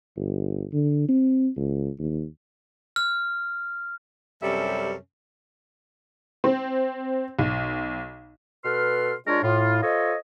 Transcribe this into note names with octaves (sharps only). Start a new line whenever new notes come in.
G1
D3
C4
C#2
D#2
F6
F#2 C3 G3 C#4 A4 E5
C4
B1
B2 A4 B4 C6 F6
G#3 D4 F4 A#4 C#5 D5
A2 F4
F4 A4 C5 C#5 D#5